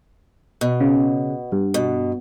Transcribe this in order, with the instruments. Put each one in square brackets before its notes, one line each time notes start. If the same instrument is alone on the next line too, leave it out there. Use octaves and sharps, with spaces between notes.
[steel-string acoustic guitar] B2
[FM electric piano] C#3
G2
[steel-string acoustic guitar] B2